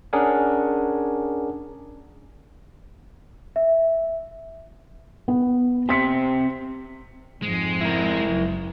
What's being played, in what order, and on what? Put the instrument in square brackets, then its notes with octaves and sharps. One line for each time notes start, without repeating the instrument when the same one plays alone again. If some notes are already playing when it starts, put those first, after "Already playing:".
[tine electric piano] C#4 D4 G#4 A#4 F#5 G#5
[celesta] E5
[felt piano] B3
[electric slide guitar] C4 G4 [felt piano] C6 B6 C#7
[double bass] F2 G#2 [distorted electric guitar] G#3
[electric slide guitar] E4 A#4
[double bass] F#1